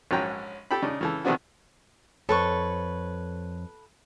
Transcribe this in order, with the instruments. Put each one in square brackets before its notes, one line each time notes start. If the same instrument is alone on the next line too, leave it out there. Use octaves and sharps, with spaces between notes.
[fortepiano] A#1 G#2 F#3 C#4 G5 A#5
G4 A4 G5 A5 B5
C#3 D4 D#4
C#3 E3 A4
C3 D#3 F3 B3 D4 F#4
[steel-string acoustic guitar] F2 C#5 [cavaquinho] A4 B4 C#6